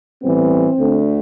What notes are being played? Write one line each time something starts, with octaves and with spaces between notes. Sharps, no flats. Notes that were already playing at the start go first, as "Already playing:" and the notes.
A2 E3 G3 B3 C4
D2 D3 A3